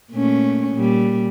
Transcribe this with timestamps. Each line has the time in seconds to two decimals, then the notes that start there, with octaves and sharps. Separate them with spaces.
0.12 A#2 A3 C#4
0.74 A#2 G3